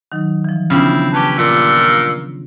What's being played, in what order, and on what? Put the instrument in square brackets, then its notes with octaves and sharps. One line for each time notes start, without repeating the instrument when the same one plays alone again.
[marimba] D#3 F#3 D#4
E3 F3
[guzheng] C#3 [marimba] B3 D4 F4 [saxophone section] C4 E4
[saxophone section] C#4 G4 B4 [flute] A5
[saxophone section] G2 A#2 [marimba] F4 [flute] E6